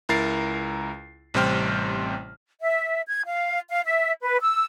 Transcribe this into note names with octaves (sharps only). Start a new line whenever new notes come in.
C#2 E4 A#4 A#5 A6 C7
A1 C3 G3 C5 G5 F6
E5
G#6
F5
F5
E5
B4
E6